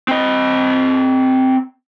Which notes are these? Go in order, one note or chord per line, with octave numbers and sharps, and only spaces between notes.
C4 D#5